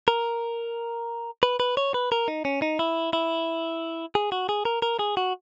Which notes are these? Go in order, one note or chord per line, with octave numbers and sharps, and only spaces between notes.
A#4
B4
B4
C#5
B4
A#4
D#4
C#4
D#4
E4
E4
G#4
F#4
G#4
A#4
A#4
G#4
F#4